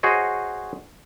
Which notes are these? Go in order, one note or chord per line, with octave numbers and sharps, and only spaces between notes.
F#4 G#4 C5 C#5 D#5